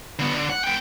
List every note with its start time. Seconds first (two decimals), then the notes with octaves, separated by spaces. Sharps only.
0.19 D3 B3
0.34 D3
0.50 F#5
0.64 B3 G5